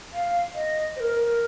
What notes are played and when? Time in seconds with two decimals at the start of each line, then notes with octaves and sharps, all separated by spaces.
0.13 F5
0.55 D#5
0.96 C5
1.00 A#4